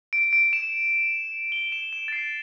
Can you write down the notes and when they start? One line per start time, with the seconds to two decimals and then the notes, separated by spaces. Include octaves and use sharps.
0.13 D7
0.33 D7
0.53 E7
1.52 G7
1.72 E7
1.93 E7
2.08 A6
2.12 C7